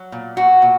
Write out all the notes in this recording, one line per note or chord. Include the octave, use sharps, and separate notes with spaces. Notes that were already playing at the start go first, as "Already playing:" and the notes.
Already playing: F#3
A#2
A#2 F#4
A#2